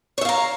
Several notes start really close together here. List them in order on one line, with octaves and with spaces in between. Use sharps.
C#5 E5 F5 A#5